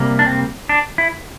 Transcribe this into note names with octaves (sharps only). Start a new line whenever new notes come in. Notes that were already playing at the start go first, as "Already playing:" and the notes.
Already playing: C3 G3 A#3
D4
C4
D4
E4